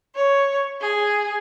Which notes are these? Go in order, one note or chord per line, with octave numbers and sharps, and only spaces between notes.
C#5
G#4